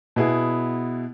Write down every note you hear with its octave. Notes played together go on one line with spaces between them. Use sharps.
B2 B3 E4 G#4